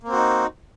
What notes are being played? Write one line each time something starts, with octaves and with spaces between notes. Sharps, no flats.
A#3 C4 D#4 F#4